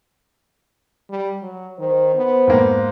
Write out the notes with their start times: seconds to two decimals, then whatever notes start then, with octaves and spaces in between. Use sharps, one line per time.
1.10 G3
1.42 F#3
1.79 D#3 C5
2.16 B3
2.47 G#2 A#3